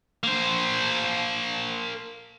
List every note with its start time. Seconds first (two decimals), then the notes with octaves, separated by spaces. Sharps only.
0.23 A#3 C5